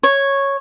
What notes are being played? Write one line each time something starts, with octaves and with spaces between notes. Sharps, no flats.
C#5